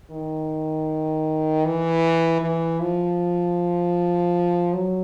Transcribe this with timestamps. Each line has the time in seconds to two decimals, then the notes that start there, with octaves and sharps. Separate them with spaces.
0.11 D#3
1.65 E3
2.42 E3
2.81 F3
4.73 F#3